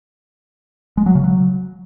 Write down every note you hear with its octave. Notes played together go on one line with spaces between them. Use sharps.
G#3
F#3
C#3
F#3